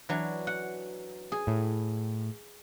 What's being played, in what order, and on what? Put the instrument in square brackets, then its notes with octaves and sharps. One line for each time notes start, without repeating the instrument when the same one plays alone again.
[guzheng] E3 F#3 D4
F#5
G#4
[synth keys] A2